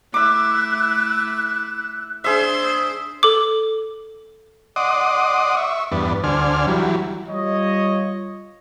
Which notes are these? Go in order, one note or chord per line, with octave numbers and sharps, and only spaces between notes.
A3 E4 E5 D6 F#6
D4 G#4 C5 E5
A4 D6
D5 D#5 F#5 C6 D6 D#6
E5 C#6
E2 G2 B3 D4
D2 D3 C5 D5 G#5 F6
E3 F#3 G3
G3 F4 C#5 D#5